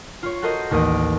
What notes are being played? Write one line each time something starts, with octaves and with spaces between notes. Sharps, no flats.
F4 C#5
F#4 A4 A#4 C5 D#5
A1 D#2 A#3 D#6 D7